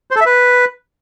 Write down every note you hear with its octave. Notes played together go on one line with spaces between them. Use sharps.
C5
A4
E5
B4